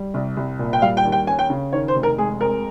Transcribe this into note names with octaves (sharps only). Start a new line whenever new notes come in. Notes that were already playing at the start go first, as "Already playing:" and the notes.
Already playing: G3
C2
C2
A#2
G5
G3 F5
G5
D#2
G5
C#4 G#5
G5
C#3
D#3 C#5
C5
F1
A#4
G#3 G#4
F2 A#4